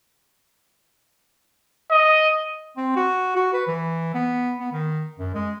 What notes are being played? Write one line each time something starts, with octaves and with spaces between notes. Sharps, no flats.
D#5
C4
F#4
F#4
B4
E3
B3
B3
D#3
F#2
G#3